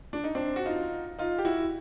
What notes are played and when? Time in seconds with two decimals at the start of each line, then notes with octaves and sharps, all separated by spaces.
0.13 D4
0.24 D#4
0.35 C4 D4
0.56 F#4
0.66 D#4 F4
1.19 D#4 F4
1.39 G4
1.45 E4 F#4